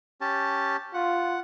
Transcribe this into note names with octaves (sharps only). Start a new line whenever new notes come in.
C#4 G4 A5
F4 F#5